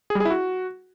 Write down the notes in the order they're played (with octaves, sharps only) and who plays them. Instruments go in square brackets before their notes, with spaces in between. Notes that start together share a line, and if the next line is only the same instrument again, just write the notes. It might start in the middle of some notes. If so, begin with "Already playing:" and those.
[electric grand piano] G#4
G3
G#4
E4
F#4